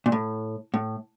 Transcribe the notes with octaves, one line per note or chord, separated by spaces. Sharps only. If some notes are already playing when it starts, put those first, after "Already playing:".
A#2
A2
A2